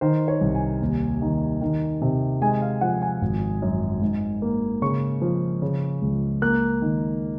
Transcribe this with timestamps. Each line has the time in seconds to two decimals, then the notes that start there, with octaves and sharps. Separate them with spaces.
0.01 D#3 C5
0.28 C#5
0.41 C2
0.55 G#5
0.82 D#2
1.22 D#3
1.61 D#3
2.02 C3
2.42 G#3 G#5
2.62 F5
2.81 F3 F#5
3.02 G#5
3.22 G#1
3.62 F#2
4.02 G#2
4.42 A#3
4.82 C#3 C#6
5.22 F3
5.62 C#3
6.02 C#2
6.42 A#3 F#6
6.82 D#3